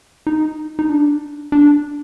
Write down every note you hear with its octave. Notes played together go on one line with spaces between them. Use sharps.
D#4
D#4
D4
D4